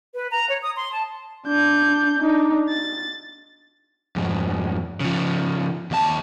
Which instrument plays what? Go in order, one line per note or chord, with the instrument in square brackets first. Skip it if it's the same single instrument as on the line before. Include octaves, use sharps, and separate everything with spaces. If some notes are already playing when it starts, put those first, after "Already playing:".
[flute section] B4
A#5
C#5
D#6
C6
A5
[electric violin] D4 G6
D4 D#4
A6
[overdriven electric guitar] F2 G#2
C#3 F3
D#2 A5